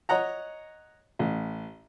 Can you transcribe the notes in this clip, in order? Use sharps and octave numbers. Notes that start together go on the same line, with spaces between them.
C#5 D#5 F#5 A#5
A1